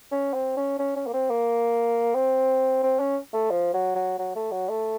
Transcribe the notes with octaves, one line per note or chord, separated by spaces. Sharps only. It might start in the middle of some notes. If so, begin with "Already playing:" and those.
C#4
C4
C#4
C#4
C#4
A#3
C4
A#3
C4
C4
C#4
A3
F3
F#3
F#3
F#3
A3
F#3
A3